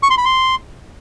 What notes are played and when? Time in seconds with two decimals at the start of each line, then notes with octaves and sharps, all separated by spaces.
0.03 C#6
0.10 C6
0.18 B5
0.25 C6